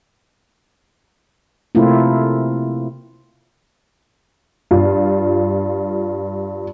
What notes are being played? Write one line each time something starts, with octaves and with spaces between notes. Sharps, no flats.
C3 A3 A#3 C4 E4 F4
G2 F4